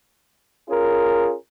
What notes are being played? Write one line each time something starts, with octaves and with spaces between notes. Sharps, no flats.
C#4 F4 G#4 A#4